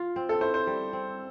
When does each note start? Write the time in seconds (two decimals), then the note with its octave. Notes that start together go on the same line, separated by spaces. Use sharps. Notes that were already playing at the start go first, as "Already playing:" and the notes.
Already playing: F4
0.16 C4
0.29 A4
0.41 E4 C5
0.54 C5
0.67 G3
0.93 C4